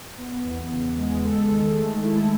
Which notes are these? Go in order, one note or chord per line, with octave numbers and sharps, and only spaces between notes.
B3
E2
C#3
G#3
A4
D#3
A3
E4